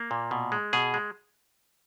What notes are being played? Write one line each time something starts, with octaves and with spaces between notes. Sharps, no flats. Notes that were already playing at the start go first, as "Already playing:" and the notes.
Already playing: A#3
A#2
B2
G#3
B2 G#4
G#3